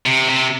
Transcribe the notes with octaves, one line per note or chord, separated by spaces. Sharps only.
C3
C3